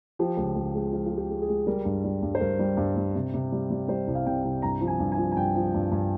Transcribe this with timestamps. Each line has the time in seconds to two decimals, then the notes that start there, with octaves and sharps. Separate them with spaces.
0.19 F3 G4
0.37 C#2
0.55 C#2
0.75 G#3
0.93 F3 F4
1.06 F4
1.12 G#3
1.17 G4
1.30 G#3
1.42 G#4
1.48 G#3
1.67 G3 A#4
1.85 G2
2.04 G3
2.22 G2
2.35 C5
2.40 G2 A#4
2.59 G3
2.77 G2
2.96 G3
3.15 C3
3.34 C3
3.52 G3
3.70 G3
3.88 G3 C5
4.07 C2
4.15 F5
4.26 C3 G5
4.44 C2
4.62 G2 A#5
4.81 F3
4.87 G#5
5.00 G2
5.12 G#5
5.18 F3
5.32 G#5
5.36 G2 G5
5.55 F3
5.74 G2
5.92 G2